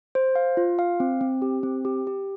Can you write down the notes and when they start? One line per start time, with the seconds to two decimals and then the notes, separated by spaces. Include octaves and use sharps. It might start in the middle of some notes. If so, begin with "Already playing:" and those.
0.15 C5
0.35 F5
0.57 F4
0.79 F5
1.00 C4
1.21 C4
1.42 G4
1.63 C4
1.85 G4
2.07 G4